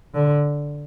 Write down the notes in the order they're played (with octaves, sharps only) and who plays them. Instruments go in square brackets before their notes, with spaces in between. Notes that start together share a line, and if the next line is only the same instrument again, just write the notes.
[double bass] D3